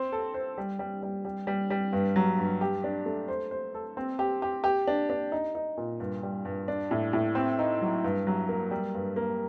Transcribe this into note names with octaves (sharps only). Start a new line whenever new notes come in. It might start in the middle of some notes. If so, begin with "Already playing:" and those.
Already playing: C4 C5
A4
C5
G3
G3
G3
G3
G3
G3
G2
F#3
G2
G4
D4
A3
C5
C5
A4
C4
G4
G4
G4
D4
D4
D#4
D#4
A#2
G2
G3
G2
D4
A2
A2
C4
D#4
F#3
G2
F#3
A#3
G3
G2
A#3